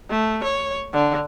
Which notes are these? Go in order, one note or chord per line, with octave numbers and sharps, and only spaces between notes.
A3
C#5
D3